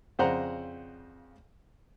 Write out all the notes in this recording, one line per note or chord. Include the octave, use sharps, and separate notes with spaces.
F2 C#3 C5 D5 F#5 A#5